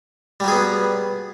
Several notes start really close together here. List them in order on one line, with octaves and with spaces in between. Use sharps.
G3 F#3 G#4 B3